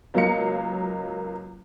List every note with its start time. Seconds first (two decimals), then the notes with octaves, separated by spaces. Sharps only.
0.14 C#2 F#3 A#3 D#5 F5 C#7